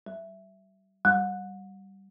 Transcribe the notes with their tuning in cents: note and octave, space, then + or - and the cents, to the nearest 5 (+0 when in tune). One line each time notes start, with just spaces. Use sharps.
G3 -30
G3 -10